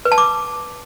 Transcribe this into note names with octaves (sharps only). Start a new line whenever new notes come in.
B4
A5
D6